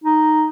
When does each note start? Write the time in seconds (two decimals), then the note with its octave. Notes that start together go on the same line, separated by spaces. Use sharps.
0.04 D#4